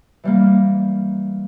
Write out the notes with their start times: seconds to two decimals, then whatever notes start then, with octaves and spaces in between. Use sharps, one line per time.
0.24 E3 G3 A#3